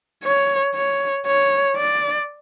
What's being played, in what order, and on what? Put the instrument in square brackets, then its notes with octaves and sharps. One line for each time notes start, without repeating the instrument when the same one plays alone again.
[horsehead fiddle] C#5
C#5
C#5
D5